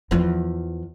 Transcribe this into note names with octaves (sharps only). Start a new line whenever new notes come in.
E2 F3